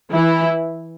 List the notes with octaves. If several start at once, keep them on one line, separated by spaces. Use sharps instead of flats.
E3 E4